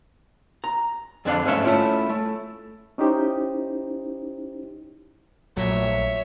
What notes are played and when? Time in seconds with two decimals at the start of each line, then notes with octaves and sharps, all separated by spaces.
0.64 A#5
1.25 F2 D3 D4 D5 F5
1.45 G#2 A3 C#4 C#5 E5
1.65 A3 C#4 E4 F4
2.09 A3
2.98 C#4 D#4 E4 G4 C5
5.57 A#1 A#2 F#3 A3 C#5 E5